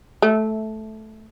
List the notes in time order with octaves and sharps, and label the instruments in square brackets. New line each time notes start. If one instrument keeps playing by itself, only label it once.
[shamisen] A3